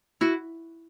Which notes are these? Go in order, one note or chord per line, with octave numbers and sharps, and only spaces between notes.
E4 F#4